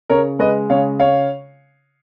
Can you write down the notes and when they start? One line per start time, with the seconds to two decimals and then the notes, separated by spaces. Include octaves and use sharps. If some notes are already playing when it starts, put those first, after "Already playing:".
0.10 C#3 A#4 C#5
0.39 G#3 B4 D#5
0.70 C#3 C#5 F5
1.00 C#5 F5